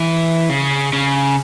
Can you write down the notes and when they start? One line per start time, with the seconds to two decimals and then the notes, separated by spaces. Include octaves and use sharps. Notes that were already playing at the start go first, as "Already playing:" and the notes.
Already playing: E3
0.50 C#3
0.93 C#3